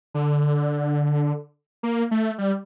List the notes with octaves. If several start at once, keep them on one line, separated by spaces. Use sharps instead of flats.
D3
A#3
A3
G3